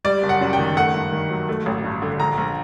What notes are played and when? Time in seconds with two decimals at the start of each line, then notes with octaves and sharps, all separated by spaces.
0.04 G3 D5
0.23 F#1
0.29 F#5
0.41 F#2
0.53 G5
0.59 D#3
0.77 A3 F#5
0.94 G2
1.12 D#3
1.30 F#3
1.49 A3
1.66 A1
1.84 G2
2.02 D3
2.20 A#1 A#5
2.38 A#1